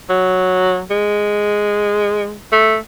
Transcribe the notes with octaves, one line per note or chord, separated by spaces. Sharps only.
F#3
G#3
A3